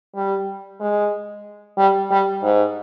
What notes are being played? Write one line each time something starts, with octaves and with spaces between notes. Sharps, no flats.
G3
G#3
G3
G3
G#2